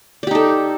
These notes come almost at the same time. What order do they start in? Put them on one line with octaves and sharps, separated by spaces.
D5 G4 D#4 A4